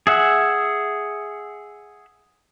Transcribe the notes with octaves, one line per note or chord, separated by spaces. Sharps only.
G#4 E5 F#5